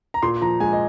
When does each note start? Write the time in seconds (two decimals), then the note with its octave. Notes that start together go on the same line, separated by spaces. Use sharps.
0.14 A#5
0.23 A#2 C6
0.41 F3 A#5
0.60 G#3 G#5
0.73 D#5